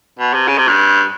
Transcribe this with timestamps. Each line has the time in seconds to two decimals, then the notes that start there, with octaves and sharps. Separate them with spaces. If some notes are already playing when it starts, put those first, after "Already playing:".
0.19 B2
0.33 C3
0.48 C#3
0.58 C3
0.68 G2